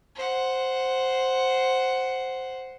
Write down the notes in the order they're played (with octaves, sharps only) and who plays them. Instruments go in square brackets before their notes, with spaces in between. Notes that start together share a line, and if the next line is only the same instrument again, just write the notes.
[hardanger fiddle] C5 F#5